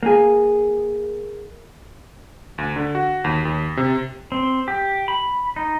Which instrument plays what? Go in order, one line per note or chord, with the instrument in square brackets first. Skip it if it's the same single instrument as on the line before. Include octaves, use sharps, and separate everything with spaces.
[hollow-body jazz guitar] A#3 G#4
[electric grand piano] D2
D3
F#4
D#2
D#2
C3
[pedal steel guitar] C4
G4
B5
D#4